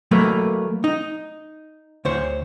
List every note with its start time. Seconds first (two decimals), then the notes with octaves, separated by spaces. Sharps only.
0.11 F#3 A3 A#3 B4
0.84 D#4
2.05 D2 C5 C#5